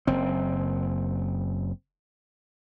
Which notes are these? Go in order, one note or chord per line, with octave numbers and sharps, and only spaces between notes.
F#1 C4